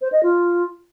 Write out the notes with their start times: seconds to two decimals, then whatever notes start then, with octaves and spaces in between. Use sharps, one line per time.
0.02 C5
0.12 D#5
0.23 F4